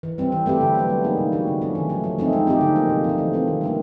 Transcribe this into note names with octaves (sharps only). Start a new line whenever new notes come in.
E3
G3 C4
E3
A3 C4 E4 G4
D3
F#3 B3
G3
A#3 D#4 G#4
C3
E3 A3 D4 F#4
D3
F3 A3 C#4
D#3
F#3 A3
F3
A3 C4 D#4
G#3
C4 D#4 G4
D3
F3 A#3
C3
F3 A3
E3
A3 C4
D#3
G3 A#3 D4